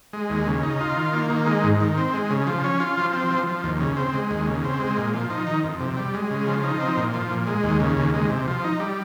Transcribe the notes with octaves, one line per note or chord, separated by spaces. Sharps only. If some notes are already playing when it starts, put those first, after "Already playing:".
G#3
D#2
C#3
D#4
F4
D#3
A#3
D#3
G#3
G#2
D#3
C4
G#3
C#3
F3
C#4
F4
F3
C4
F3
F3
D#2
C#3
C4
G#3
D#2
C#3
C4
G#3
A#2
F3
D#4
D#3
F2
C3
G3
G#3
C#3
F3
D#4
C4
A#2
F3
A#2
G#3
D#2
C#3
D#2
G#3
C3
F3
D#4
G3